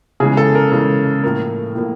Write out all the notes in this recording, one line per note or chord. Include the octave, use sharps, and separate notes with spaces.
C#3 E3 G#3 G#4
A4
A#4
C#3 E3 G#3
A2 F3 A#3 A#4
A2 F3 A#3